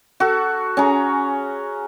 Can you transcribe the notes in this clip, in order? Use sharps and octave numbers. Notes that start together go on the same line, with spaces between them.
F#4 A4
C#4 G#4 A#5